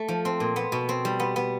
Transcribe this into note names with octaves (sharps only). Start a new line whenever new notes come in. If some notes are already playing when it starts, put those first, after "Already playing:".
Already playing: A3
F3
C4
A#2
B3
B2
C4
G3
B3
B3